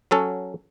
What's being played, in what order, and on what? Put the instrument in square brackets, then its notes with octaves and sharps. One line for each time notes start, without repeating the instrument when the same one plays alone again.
[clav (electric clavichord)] F#3 C#4 F#4 A4